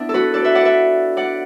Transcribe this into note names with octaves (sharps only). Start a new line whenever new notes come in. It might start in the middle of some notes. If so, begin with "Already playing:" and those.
Already playing: B3 D4 E4
A4
F#4 B4
A4 D5
B4 E5
D5 F#5
B4 E5
D5 F#5